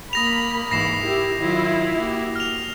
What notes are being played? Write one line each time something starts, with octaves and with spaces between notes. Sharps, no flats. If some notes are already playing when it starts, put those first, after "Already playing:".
A#3 B5 D#6 A#6 F7
G#2 E3 A#6 C7 E7
E4 G4 A#4
D#3 F#3 E4 F4
A#3 F#4 G4
F6 F7